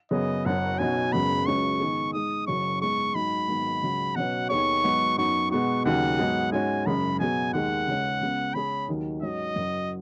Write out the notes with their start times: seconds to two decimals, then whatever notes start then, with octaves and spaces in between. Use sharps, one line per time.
0.11 F#2 C#3 B3 G#4 C#5 D#5
0.45 F#1 F#2 F#3 C#4 F#5
0.79 B1 B2 F#3 C#4 F#4 G#5
1.13 F#1 F#2 C#3 G#3 B3 B5
1.46 C#2 C#3 F#3 C#4 F#4 C#6
1.80 G#2 D#3 B3 G#4
2.13 G#2 G#3 D#4 D#6
2.47 F#1 F#2 C#3 F#3 C#4 C#6
2.81 G#2 G#3 B3 C#6
3.15 G#2 F#3 D#4 B5
3.48 G#1 G#2 D#3 F#3 B3
3.82 C#2 C#3 F#3
4.16 B2 F#3 C#4 B4 F#5
4.50 D#2 D#3 B3 G#4 C#5 C#6
4.84 G#2 F#3 B3 F#4
5.17 F#2 F#3 B3 D#4 C#6
5.51 B2 G#3 B3 F#4 C#6
5.85 D#2 C#3 F#3 F#5
6.18 G#2 F#3 B3 G#4
6.52 G#2 G#3 C#4 F#4 G#5
6.86 F#1 F#2 C#3 G#3 B5
7.20 B2 F#3 B3 G#4 G#5
7.54 D#2 D#3 G#3 F#5
7.88 C#2 C#3 G#3 C#4
8.21 C#2 C#3 B3
8.54 C#3 G#3 C#4 G#4 C#5 B5
8.88 D#2 D#3 F#3
9.22 G#2 F#3 C#4 D#5
9.56 F#1 F#2 F#3